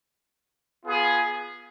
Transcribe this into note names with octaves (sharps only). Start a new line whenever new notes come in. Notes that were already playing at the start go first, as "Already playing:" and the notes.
B3 F4 G#4